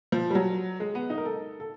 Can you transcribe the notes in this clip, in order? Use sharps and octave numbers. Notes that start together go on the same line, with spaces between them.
F3
G3
F#3
G#3
B3
D#4
A#4
A4
A4